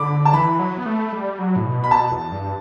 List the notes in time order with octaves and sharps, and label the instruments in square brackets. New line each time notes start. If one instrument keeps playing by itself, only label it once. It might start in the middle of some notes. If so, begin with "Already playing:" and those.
Already playing: [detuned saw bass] D3 [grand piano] B5 D6
[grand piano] A5
[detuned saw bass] E3 [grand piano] B5
[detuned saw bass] F#3
B3
A3
G3
F#3
A2
B2
[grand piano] B5
[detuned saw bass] B2 [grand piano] A5
[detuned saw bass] E2
G2